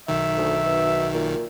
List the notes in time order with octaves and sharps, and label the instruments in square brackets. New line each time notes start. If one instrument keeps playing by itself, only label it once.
[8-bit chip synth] B1 D#3 [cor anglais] E5
[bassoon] D2
B2
A#2